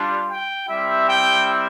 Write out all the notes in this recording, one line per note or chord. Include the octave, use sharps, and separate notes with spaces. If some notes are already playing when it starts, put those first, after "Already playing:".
Already playing: G3 D4 F4
G5
G3 C4 E4 G4 E5
G5